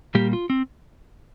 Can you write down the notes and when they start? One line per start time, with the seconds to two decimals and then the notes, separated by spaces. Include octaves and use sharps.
0.15 A#2 G3 A#3 G4
0.33 F4
0.50 C4